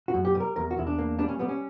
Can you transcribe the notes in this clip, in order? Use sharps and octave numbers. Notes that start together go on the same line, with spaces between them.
F#4
F#2
G4
G3
A#4
E2 A#4
F#4
E2 E4
D4
A#3
G3 D4
C#4
G3 B3
C#4